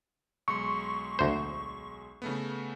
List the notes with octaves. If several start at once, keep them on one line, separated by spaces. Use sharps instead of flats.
B1 G#3 C6 C#6
D2 C5
C#3 A3 B3